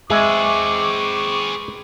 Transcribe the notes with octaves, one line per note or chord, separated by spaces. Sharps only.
G#3 C4 G#4 B4 E5 C#6 D6